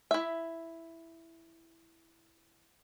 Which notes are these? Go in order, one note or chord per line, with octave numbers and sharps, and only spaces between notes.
E4 E5